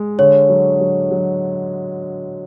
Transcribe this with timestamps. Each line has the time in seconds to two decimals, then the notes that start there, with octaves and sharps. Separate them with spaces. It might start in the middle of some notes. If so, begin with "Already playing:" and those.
Already playing: G#3
0.18 D3 C#5
0.50 F#3
0.80 F#3
1.11 F#3